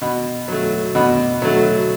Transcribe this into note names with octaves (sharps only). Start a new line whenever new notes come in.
B2
F#3 A3
B2
F#3 A3